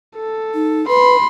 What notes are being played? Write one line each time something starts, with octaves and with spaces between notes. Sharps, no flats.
A4
D#4
B4 B5 C6